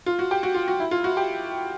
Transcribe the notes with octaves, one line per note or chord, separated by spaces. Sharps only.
F4
F#4
G4
F#4
F4
F#4
E4
F4
F#4
G4